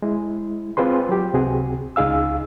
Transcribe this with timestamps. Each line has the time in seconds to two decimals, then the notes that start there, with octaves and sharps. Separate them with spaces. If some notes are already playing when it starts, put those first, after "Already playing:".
0.02 G#3 E4
0.77 C4 F4 G#4 B4 C6
1.09 F#3 G4
1.34 C#2 C3 C4 F#4 G#4
1.96 C#2 D#4 G#4 F5 E6